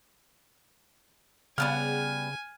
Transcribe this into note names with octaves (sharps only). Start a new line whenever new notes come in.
C#3 G3 B3 F#5 G#5 F6